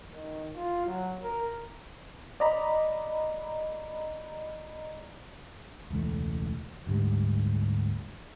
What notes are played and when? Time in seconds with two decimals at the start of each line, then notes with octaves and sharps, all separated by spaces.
0.12 D#3
0.55 F4
0.87 F#3
1.23 A#4
2.40 D5 D#5 A#5 B5
5.90 E1 C#2 E3 A3
6.87 D2 G#2 G3